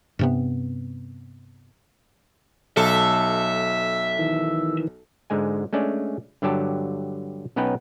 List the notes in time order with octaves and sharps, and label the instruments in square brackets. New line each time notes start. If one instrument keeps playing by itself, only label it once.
[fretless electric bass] G2 C3 B3
[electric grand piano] B1 [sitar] A4 [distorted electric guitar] E5
[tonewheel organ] D#3 E3
[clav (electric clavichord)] G#2 D3 G#3 G#5
G#3 A3 C#4 D4 D5
G2 D3 F#3 G4 A5
B1 B3 C#4 D#4 B4 G5